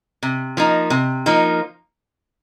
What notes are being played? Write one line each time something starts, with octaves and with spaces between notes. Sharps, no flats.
C3
F3 A#3 D#4
C3
F3 A#3 D#4